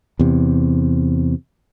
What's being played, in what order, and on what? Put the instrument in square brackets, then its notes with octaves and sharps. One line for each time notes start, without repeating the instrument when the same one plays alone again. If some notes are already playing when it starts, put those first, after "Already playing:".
[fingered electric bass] E2 C3